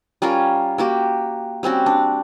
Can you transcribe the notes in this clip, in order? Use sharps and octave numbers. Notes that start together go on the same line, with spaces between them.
G3 C#4 F4 A#4
A#3 F#4 G4
G3 C4 C#4 F#4
D4